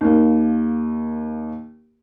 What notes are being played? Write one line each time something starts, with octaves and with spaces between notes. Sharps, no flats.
D#2 A#3